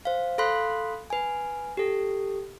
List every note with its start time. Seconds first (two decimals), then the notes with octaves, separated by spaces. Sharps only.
0.05 C5 F5
0.38 A4 F5 B5 C6 F#6 B6
1.10 B4 G#5
1.77 G4 A4